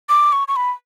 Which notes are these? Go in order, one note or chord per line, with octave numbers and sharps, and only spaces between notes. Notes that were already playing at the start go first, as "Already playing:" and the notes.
D6
C#6
C#6
B5